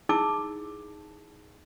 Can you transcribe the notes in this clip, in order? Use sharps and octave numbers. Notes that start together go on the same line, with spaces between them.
D#4 E4 G#4 A5 D6 E6